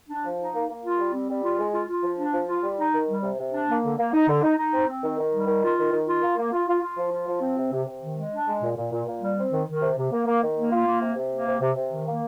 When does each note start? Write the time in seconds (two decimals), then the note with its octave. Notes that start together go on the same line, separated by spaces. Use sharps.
0.09 D4
0.24 F3
0.39 D#4
0.54 A#3
0.69 A#3
0.84 F4
0.98 G3
1.13 C4
1.29 G3
1.43 F4
1.59 G#3
1.74 F4
1.88 F4
2.03 F3
2.18 D4
2.33 F3
2.48 F4
2.63 G3
2.78 D#4
2.93 D#3
3.08 G3
3.23 C3
3.38 C3
3.53 D4
3.69 A#3
3.83 D3
3.98 A#3
4.13 D#4
4.28 D3
4.43 D#4
4.58 D#4
4.73 C4
4.88 C4
5.03 D#3
5.18 D#3
5.33 G3
5.47 D#3
5.63 F4
5.78 D#3
5.92 D#3
6.07 F4
6.22 A#3
6.37 A#3
6.52 F4
6.67 F4
6.82 F4
6.97 F3
7.12 F4
7.27 F3
7.41 C4
7.57 C3
7.72 C3
7.87 C3
8.02 D#3
8.17 G#3
8.32 D4
8.47 G#3
8.62 A#2
8.77 A#2
8.92 A#2
9.07 A#2
9.22 G3
9.37 C4
9.51 D#3
9.67 D#3
9.81 C3
9.96 C3
10.11 A#3
10.26 A#3
10.42 D#3
10.56 A#3
10.71 F4
10.86 A#3
11.01 C3
11.16 C3
11.31 A#3
11.46 C3
11.61 C3
11.76 C3
11.91 D#3
12.06 A#3